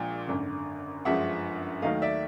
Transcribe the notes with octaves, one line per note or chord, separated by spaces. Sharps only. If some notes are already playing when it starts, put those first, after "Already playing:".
Already playing: A#1 A#2 F3 G#3
G#1 F#2 D3
G1 F#2 D3 F3 G#3 E5 F#5
D#2 D#3 F#3 A3 D#5 F5
D5 E5